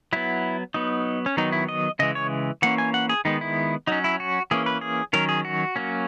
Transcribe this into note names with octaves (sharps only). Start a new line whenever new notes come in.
F#3 B3 E4
F#3 B3 D#4
C#4
D#3 F#3 B3 D#4
E4
D#5
C#3 E3 G#3 D#5
C#5
E3 A#3 C#4 F#5
G#5
F#5
G#4
D#3 G#3 B3 D#4
E4
F#3 C#4 D#4
E4
F#4
E3 A#3 C#4 G#4
B4
G#4
D#3 F#3 C#4 A#4
G#4
F#4
F#3 A#3 C#4